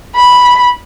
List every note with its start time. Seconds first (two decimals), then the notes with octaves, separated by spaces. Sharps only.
0.16 B5